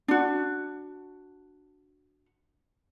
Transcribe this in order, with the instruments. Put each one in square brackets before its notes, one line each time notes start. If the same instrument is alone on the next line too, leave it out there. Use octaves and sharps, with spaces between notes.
[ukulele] D4 F#4